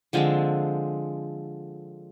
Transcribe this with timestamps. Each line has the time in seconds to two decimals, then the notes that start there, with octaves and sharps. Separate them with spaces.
0.13 D3 F3 G#3 C4